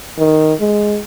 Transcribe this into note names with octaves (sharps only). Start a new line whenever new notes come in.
D#3
G#3